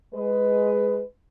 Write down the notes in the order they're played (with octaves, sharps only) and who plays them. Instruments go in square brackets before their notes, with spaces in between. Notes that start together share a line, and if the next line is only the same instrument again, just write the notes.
[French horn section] G#3 B4